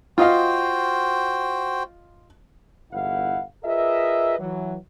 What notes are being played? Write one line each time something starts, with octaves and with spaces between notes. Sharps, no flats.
F4 F#4 C5 D#5 F5 G5
G1 E2 E4 F5 F#5
F4 G#4 A#4 B4 D#5 E5
E3 F#3